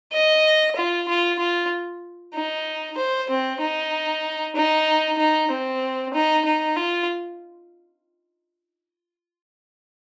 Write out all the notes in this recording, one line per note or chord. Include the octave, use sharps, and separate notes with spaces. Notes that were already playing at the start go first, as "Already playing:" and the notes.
D#5
F4
F4
F4
D#4
C5
C4
D#4
D#4
D#4
C4
D#4
D#4
F4